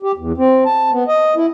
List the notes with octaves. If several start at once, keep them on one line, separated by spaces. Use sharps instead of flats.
G4
E2
C4
A5
B3
D#5
E4